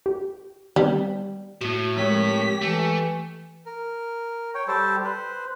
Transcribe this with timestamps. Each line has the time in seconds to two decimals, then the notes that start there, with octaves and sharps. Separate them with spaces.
0.06 G4
0.76 D#3 G3 B3 C4
1.61 A2 A#3 F#4
1.97 F3 G#3 C4 G4 A#4 C#5 B6
2.61 E3 A3
3.66 A#4
4.55 C#5 G5
4.68 G3 G4 A4 C5
5.05 B4 C5